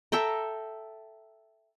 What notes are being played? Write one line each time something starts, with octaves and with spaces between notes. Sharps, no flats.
A4 E5 G5 A#5